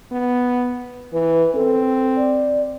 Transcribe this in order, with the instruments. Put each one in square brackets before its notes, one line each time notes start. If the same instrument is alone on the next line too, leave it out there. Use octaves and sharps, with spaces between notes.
[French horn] B3
[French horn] E3 [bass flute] B4
[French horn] C4 [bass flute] A4
[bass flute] D5